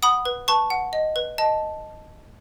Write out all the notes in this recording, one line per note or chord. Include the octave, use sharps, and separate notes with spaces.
F#5 B5 D#6
B4
B4 A5 C#6
F#5
D#5
B4
D#5 A5